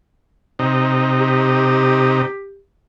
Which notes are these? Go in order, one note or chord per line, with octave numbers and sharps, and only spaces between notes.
C3 D#4
G4